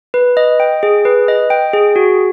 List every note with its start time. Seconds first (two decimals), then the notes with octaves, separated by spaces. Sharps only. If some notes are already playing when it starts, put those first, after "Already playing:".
0.14 B4
0.37 D#5
0.60 G5
0.83 G#4
1.05 B4
1.28 D#5
1.50 G5
1.73 G#4
1.96 F#4